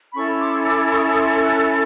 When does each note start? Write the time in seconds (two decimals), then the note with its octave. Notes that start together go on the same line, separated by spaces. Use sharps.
0.14 C#4 E4 A4 B5 C#6
0.40 C6 D6
0.67 D6 E6
0.92 C#6 D#6
1.08 D#6
1.18 C6 D6
1.45 E6 F#6